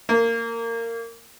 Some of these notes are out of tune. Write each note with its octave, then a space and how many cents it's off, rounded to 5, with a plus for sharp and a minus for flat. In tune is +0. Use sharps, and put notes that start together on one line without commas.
A#3 -20